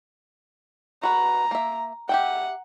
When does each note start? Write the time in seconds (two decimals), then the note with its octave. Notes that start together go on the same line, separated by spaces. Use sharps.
1.03 F#4 B4 A#5
1.51 A#3 E5
2.09 G4 E5 F#5 G5